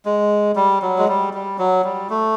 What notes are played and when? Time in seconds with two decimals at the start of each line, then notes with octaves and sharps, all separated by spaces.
0.06 G#3
0.56 G3
0.82 F#3
0.98 G#3
1.08 G3
1.34 G3
1.59 F#3
1.85 G3
2.10 A3